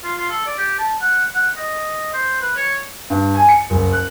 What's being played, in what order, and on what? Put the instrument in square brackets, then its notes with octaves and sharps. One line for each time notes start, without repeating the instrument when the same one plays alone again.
[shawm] F4
F4
A4
D5
G4
A5
F#5
F#5
D#5
C5
B4
C#5
[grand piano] G2
G#5
C#7
F#1
F#6